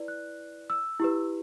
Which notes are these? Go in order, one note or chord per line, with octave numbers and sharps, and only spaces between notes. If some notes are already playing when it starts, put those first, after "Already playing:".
Already playing: E4 B4 D5
F#6
E6
E4 G4 B4